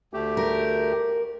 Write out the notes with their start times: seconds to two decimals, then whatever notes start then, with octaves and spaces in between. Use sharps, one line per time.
0.13 D2 A3 G4
0.37 A#4